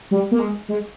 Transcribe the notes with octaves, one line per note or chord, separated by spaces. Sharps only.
G3
A#3
G#3
G#3